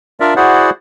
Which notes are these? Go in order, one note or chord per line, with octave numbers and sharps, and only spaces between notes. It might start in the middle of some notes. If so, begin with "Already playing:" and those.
D4 F4 A#4 D5 E5
E4 F#4 G#4 C5 D5 F#5